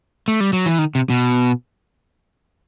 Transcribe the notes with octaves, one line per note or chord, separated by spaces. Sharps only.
A3
G3
F#3
E3
D#3
C3
B2